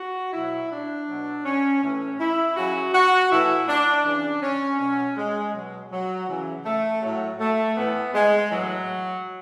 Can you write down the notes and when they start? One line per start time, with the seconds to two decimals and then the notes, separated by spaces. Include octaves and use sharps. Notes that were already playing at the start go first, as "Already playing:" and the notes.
Already playing: F#4
0.33 B2 F#3 E4
0.71 D4
1.08 B2 F#3
1.45 C#4
1.82 A2 E3 C#4
2.19 E4
2.56 C#3 F#3 F#4
2.94 F#4
3.31 A2 E3 E4
3.68 D4
4.05 C#3 E3 D4
4.42 C#4
4.79 B2 F#3 C#4
5.17 G#3
5.53 B2 F#3
5.91 F#3
6.28 C#3 E3
6.65 A3
7.02 A2 F#3
7.40 A3
7.77 A2 E3 B3
8.14 G#3
8.51 A2 E3 F#3